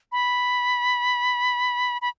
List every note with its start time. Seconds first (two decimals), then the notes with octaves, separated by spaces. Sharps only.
0.12 B5
2.02 B5